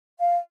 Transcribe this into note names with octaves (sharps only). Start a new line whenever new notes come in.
F5